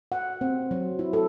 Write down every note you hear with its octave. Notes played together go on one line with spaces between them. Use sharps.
F#5
C4
F#3
E4
A4